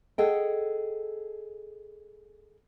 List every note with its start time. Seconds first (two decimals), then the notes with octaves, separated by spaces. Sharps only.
0.18 G#4 A4 D#5 F#5 G5